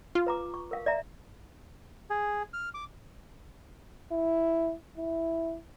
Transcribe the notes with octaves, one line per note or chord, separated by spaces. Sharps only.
F4
B4 A#5 D6
C#6
A#4 F5
D5 E5 A#5
G#4
F6
D6
E4
E4